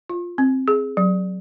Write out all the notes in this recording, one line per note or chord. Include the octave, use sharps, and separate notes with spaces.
F4
C4
G#4
F#3